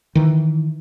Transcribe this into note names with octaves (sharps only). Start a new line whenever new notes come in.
D#3 E3